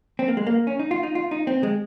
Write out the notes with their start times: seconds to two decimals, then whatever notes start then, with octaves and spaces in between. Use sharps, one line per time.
0.19 C4
0.28 A#3
0.37 G#3
0.47 A#3
0.67 C#4
0.79 D#4
0.91 F4
1.03 D#4
1.15 F4
1.31 D#4
1.47 C4
1.63 G#3